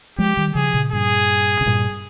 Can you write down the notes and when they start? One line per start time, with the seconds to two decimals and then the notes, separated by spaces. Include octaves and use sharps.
0.18 F3 G#3 G4
0.37 D#3 G3
0.55 C#3 F3 G#4
0.74 A#2 C#3
0.92 G2 A#2 G#4
1.61 C3
1.66 G2 A#2